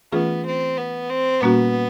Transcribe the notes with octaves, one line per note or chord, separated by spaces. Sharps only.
E3 A3 B3 C#4 F4 G#4
C4
B3
C4
A#2 G3 A#3 B3 C#4 F#4